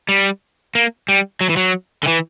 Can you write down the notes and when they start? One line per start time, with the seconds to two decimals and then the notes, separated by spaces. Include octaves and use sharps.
0.09 G3
0.75 A#3
1.09 G3
1.41 F#3
1.50 E3
1.57 F#3
2.03 D3
2.07 E3